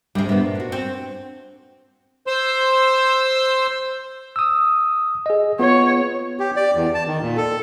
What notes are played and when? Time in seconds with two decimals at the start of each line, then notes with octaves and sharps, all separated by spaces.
0.15 D2 C3 G3
0.29 A#2 B3 E5
0.41 G2
0.55 D4 F#4
0.72 C4
2.27 C5 C6 E6
4.36 D#6 E6
5.26 G#4 D#5
5.59 B3 F4 C#5
6.39 G4
6.56 D5
6.75 E2
6.94 A5
7.07 D#3
7.21 A#2
7.37 A4